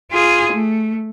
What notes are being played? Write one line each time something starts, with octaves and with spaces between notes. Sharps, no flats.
F4 G#4
A3